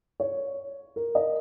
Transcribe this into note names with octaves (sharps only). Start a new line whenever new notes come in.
C#5
A#4
D#5